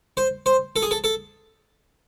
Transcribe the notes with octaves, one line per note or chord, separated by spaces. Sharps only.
C5
C5
A4
G#4
A4
A4